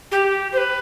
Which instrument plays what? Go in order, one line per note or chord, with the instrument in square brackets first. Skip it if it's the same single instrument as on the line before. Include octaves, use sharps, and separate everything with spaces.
[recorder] G4
C5
B4